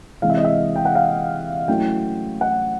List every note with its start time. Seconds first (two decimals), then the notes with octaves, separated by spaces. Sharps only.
0.22 C3 E3 G#3 F5
0.30 E5
0.37 D#5
0.45 E5
0.76 G5
0.85 F#5
0.95 F5
1.68 F#3 A3 C#4 E4 G5
2.41 F#5